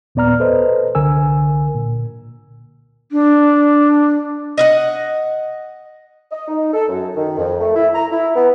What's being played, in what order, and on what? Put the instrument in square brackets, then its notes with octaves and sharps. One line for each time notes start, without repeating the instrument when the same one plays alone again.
[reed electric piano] D#2 A#2 B3 D5 A#5 F6
A4 B4 C5 D#5
C2 D3 A#4 G#5 E6
A#2
[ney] D4
[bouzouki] D#5 E5 F#5
[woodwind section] D#5
D#4
A4
F#2
D#3
F2
A3
E4
A#5
E4
B3